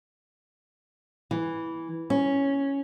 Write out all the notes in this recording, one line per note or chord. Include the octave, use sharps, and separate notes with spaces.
E3
C#4